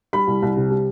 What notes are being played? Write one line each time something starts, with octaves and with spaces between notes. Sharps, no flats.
G3 B5
C2
C2
C3
G3